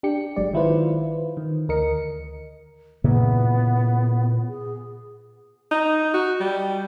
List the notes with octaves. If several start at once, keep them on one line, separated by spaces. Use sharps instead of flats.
D4 G4 C#7
G#1 F#3 G#3 D5
D#3 E4 F4 B4 C5
D#3
D2 A#4 D#5 C#7
A#2 C#3 E3 B3
G#4
D#4
F#4
G3